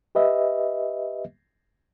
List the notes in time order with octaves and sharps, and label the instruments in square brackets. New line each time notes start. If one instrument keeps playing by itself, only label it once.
[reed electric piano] G4 B4 D#5 E5